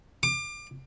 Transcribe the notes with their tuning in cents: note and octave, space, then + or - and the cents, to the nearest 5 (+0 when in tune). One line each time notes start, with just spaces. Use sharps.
D6 +30